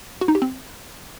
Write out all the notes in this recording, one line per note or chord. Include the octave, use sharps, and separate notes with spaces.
F#4
D#4
G4
C4